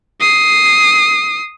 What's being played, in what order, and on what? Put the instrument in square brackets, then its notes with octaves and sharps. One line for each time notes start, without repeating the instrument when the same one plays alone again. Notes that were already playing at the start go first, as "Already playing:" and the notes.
[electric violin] D#6 C7